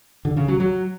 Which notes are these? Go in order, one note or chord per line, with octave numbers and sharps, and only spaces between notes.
D3
C#3
F#3
F#3